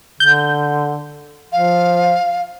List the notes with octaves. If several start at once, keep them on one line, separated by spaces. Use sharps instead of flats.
D3 G6
F3 F5